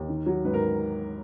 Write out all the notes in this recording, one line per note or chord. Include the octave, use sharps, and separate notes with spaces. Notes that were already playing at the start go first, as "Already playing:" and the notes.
Already playing: D#2
D#3
F#3
G#2 B4
A#4